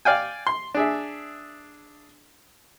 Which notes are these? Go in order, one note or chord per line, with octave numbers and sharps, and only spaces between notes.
D5 F5 G5 G#5
C6
D4 G#4 E5